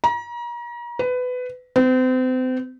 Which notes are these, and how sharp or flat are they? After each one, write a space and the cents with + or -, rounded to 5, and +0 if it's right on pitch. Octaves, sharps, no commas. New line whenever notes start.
A#5 +35
B4 +20
C4 -35